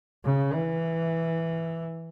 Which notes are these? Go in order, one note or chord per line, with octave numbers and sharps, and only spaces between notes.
C#3
E3